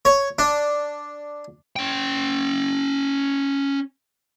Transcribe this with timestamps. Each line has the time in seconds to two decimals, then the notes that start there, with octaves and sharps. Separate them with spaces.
0.05 C#5
0.39 D4
1.76 C#4 G5